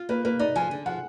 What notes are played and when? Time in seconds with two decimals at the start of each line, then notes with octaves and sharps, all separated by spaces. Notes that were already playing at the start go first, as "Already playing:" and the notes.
Already playing: F4
0.09 A#3 B4
0.25 A#3 B4
0.39 D#4 D5
0.56 F3 G#5
0.71 D3
0.86 F3 F#5